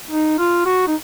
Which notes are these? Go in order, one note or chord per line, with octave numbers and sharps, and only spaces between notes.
D#4
F4
F#4
D#4